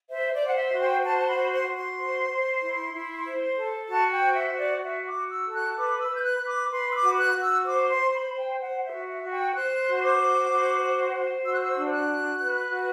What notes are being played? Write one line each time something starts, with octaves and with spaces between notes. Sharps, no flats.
C5 E5
D5
C5
F#5
E5
F#4
G5
C5 A5
A5
B5
F#4
C6
F#4
C6
C5
C5
E4
E4
C5
A4
F#4 A5
G5
C5
E5
F#4
D5
F#4 E5
D6
F#4
E6
A4
F#6
B4 D6
E6
B4
G6
F#6
B4
D6
B4 C6
E6
D6
F#4
F#6
F#4
E6
C5 D6
C6
C5
B5
C5
G5
C5 F#5
E5
F#4
E5
F#4
G5
C5 F#6
F#4
C6
D6
C5
F#4
C5
C5
F#4 E6
F#6
E6
D4
F#6
F#4
B4
F#4